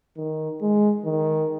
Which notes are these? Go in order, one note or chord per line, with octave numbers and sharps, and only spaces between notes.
D#3
G#3
D#3